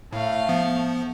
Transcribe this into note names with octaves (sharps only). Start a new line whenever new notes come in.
A2 A3 F5
F3 B3